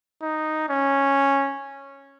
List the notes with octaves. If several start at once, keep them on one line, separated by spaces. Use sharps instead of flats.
D#4
C#4